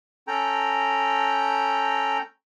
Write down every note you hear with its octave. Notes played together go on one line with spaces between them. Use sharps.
C#4 A4 G5 A#5